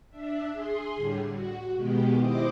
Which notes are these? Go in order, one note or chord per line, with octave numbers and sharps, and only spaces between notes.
D4 E5
G#4 C6
A2 D3 G3
F#4
B2 D#3 G#3 B3 G4
E4 C5 D#5 D6